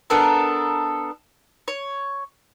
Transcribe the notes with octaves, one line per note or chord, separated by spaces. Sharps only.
B3 D4 A4 A#4
C#5